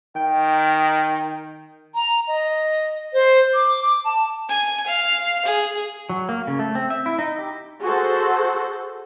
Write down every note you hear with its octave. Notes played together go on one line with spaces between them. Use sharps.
D#3 G5
A#5
D#5
C5
D6
D6
A5
G#5
F5
G#4
F#3
A#3
C#3
A3
C4
E5
E4
D#4
G4
F#4 G#4 A4 C5